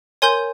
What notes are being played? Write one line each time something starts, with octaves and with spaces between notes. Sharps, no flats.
A#4 C#5 G#5 C6 G6